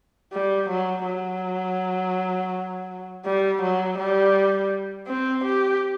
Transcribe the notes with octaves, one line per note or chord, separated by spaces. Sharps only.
G3
F#3
F#3
G3
F#3
G3
C4
G4